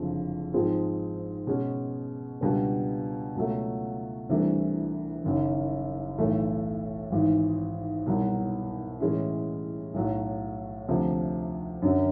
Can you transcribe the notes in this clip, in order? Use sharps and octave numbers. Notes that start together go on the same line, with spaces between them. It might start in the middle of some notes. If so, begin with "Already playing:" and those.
Already playing: F#1 F2 D3 F3 G#3
G#2 F3 G#3 C4 F4
B2 G#3 C#4
C#2 B2 G3 B3 D4
C#2 B2 F#3 A3
C2 C3 E3 A3 D4
F#1 F#2 D#3
B1 A2 E3 A3
G#1 G#2 E3
C2 B2 F#3
A2 E3 G#3 C#4 E4
B1 A2 F#3
D2 C3 F3
F#2 D3 F#3